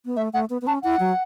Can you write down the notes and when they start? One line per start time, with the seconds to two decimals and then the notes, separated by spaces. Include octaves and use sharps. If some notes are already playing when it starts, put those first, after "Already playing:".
0.05 B3
0.17 A3 E5
0.33 A3 F#5
0.50 B3
0.62 B3
0.67 C#4 A5
0.83 E4 F#5
1.00 F#3